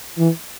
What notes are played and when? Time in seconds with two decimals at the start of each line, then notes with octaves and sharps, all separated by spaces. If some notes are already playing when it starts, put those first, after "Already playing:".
0.18 E3